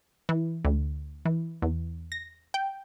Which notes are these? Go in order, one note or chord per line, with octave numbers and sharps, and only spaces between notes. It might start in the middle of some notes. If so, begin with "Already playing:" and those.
E3
D2
E3
E2
A#6
G5